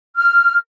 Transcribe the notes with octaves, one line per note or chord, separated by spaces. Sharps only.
F6